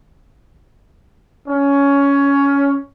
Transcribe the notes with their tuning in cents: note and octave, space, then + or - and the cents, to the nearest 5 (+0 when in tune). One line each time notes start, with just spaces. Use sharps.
C#4 +15